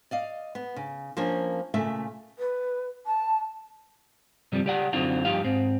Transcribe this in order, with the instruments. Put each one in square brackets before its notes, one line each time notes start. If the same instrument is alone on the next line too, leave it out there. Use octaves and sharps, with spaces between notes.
[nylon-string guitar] D5 D#5 F5
B3
C#3
F3 A#3 C#4 D4 A#4 C#5
A#2 C#3 A3 E5
[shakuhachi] B4
A5
[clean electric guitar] G2 C3 F3 G3
C#2 G4 D5 F#5
F#2 D3 C4 D#4 F4 F#4
G2 F3 D#4 G4 F5
G#2 C4